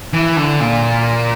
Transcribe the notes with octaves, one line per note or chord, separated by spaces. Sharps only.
E3
D3
A#2